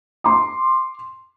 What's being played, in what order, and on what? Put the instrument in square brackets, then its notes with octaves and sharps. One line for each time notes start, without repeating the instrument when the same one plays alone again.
[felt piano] C6 D6